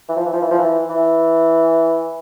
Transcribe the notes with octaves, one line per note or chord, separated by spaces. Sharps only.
E3
F3
E3
F3
E3
F3
E3
E3